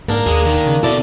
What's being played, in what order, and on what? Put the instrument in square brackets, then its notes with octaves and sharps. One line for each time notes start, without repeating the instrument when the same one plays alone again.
[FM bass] G#2 [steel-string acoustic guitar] A#3 D4 A#4
[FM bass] D#2 [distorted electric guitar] G#4 D#5
[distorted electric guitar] D#3
[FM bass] C#3
[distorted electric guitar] B2 [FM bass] E4 [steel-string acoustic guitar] A4 D5